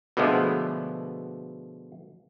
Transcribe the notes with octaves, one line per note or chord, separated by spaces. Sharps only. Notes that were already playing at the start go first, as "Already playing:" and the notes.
B2 D3 F3 G#3 A3 B3